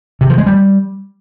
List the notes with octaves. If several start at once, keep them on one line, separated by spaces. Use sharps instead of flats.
C3
F3
G#3
G3